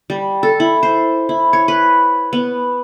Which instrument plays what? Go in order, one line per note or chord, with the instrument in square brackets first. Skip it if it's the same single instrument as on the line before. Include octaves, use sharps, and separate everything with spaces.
[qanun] G3
A4
E4
C5
E4
C#5
B4
B3